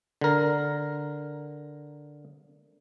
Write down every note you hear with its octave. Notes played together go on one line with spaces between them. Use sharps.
D3 A#4